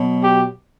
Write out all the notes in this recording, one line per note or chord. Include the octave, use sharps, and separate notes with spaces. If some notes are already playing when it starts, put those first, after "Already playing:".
Already playing: B2 F#3
G4